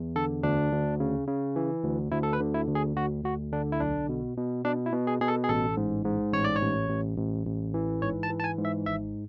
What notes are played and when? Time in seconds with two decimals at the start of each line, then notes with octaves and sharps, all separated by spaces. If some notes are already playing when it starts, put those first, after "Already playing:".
Already playing: E2
0.16 D3 A4
0.43 D2 D4
0.72 D2
1.00 C#3
1.28 C#3
1.56 E3
1.84 D2
2.12 D2 E4
2.23 A4
2.33 B4
2.40 D3
2.54 E4
2.68 D2
2.75 G#4
2.96 D2 F#4
3.24 D2 F#4
3.52 D3 D4
3.72 E4
3.80 B1 D4
4.09 B2
4.37 B2
4.65 B2 D4
4.86 E4
4.93 B2
5.07 G#4
5.21 B2 G#4
5.28 A4
5.44 G#4
5.49 A1 A4
5.77 G#2
6.05 G#2
6.33 A1 C#5
6.44 D5
6.56 C#5
6.61 A1
6.89 A1
7.18 A1
7.46 A1
7.74 E3
8.02 G#2 C#5
8.23 A5
8.30 E3
8.40 A5
8.44 G#5
8.58 G#2
8.65 E5
8.86 G#1 E5